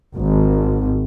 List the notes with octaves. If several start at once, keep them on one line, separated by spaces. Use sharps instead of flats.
G#1